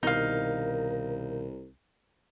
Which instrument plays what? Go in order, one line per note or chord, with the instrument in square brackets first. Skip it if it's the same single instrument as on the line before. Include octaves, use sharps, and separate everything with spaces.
[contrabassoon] C2 [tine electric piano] B2 D#3 [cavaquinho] D#4 F5 [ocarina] A#4